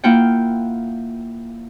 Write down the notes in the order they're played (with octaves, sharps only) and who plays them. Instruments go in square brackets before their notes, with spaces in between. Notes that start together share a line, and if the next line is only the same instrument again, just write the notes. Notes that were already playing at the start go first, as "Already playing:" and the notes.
[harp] A#3 E4 F4 F#5 G5